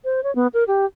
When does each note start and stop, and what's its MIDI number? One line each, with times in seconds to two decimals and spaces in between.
0.05 0.23 72
0.24 0.34 73
0.35 0.47 59
0.54 0.64 70
0.68 0.85 67